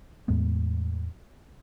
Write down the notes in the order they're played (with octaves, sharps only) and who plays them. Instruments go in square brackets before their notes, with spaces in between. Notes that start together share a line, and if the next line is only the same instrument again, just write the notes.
[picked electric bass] E2 A2 G#3 B3